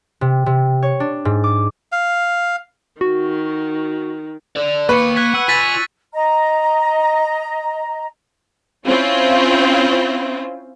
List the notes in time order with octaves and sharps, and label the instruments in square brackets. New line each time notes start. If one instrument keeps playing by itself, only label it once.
[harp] C3
C3
C#5
D4
G#2
D6
[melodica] F5
[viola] D#3 [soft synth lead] F#4
[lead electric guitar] A4 D5
[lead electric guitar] D#2 A#3 [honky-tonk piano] B4 [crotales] C#6 C#7
[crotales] F#6 G#6 B6
[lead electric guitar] F#5 [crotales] E6 D#7
[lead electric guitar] F4 G#5 [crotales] A6 B6 D#7
[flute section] D#5 A#5
[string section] C4 C#4 E4 F4